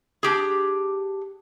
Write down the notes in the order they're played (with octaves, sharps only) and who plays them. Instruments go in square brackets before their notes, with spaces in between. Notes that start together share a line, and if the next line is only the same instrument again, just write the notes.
[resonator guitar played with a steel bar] D4 G4 G#4